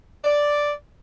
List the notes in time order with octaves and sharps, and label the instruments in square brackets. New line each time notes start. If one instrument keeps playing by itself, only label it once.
[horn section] D5